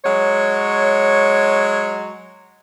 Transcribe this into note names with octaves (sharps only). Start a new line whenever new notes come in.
F#3 G#3 C#5